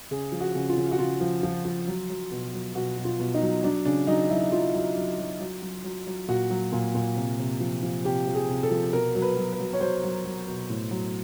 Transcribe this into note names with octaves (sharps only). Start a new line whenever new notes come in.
C#3 G#4
F3
F#4
C#3
F4
C#3
F#4
C#3 F4
F3
F3
F3
F#3
F#3
B2
F#3
B2 F#4
B2
F4
B2
D#4
F#3
F#3 D4
C#3 D4
F#3 D#4
F#3 E4
F#3 F4
F#3
F#3
F#3
F#3
F#3
F#3
F#3
A#2 F#4
F#3
A#2
A#2
C3
C3
F3
F3
C3 G4
F3
G#4
C3
A4
F3
B2 A#4
F#3
B4
F#3
B4
F#3
C#5
F#3 C5
F#3
F#3
B2
A2
F#3